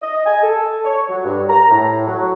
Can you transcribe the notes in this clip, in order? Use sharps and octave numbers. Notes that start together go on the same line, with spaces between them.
D#5
G#5
A4
C#5
F#3
G2
A#5
A2
F#3